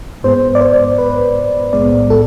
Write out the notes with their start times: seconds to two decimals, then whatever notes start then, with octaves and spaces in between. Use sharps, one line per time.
0.24 G#2 G#3 B3 C5
0.55 D5
0.61 C5
0.98 B4
1.73 B1 A2 G#3 B3 D5
2.10 A4